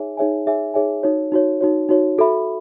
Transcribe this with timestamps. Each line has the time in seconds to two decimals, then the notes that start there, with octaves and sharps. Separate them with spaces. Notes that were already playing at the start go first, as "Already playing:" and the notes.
Already playing: D#4 G#4 C#5 E5 G#5
0.17 D#4 G#4 C#5 E5 G#5
0.46 D#4 G#4 C#5 E5 G#5
0.74 D#4 G#4 C#5 E5 G#5
1.03 D#4 F#4 C#5
1.32 D#4 F#4 C#5
1.61 D#4 F#4 C#5
1.89 D#4 F#4 C#5
2.18 F#4 A4 E5 B5